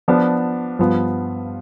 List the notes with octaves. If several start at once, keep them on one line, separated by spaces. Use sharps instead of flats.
F3 B3 D4
G2 F3 B3 F4